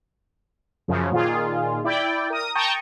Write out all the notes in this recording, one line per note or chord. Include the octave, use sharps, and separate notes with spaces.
F#2 C#3 F3
A#2 D#3 F4 G#4
E4 D5 G5
A#4 D#6
G5 A5 A#5 C#6 D#6 G6